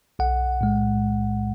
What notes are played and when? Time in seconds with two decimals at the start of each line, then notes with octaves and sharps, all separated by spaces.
0.19 B1 F#5
0.61 A2 G#3